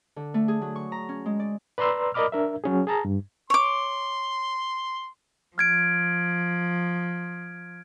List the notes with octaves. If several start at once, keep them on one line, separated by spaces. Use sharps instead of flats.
D3
A3
G#4
F#3
C#6
A#5
C#4
G#3
D5
B4 D5 A#5 C6 E6
A#4 D5 D#5 B5 D6 F6
D4 A#4 E5
F#3 C#4 G#4
G#4 A5 A#5
G2
C#5 C6 D6
F3 F6 G#6 D7